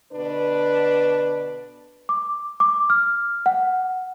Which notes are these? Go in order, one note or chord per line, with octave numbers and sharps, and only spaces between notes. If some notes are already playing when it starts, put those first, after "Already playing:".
B2 D3 D4 B4
D6
D6
F6
F#5